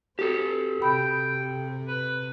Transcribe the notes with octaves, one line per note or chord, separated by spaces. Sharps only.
C4 F#4 G4 A4
C3 G5 B5
B4